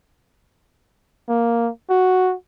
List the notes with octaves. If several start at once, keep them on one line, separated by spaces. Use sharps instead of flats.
A#3
F#4